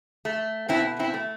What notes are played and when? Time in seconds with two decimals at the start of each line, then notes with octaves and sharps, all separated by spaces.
0.25 A3
0.69 B2 C4 E4
0.99 C4 E4
1.14 A3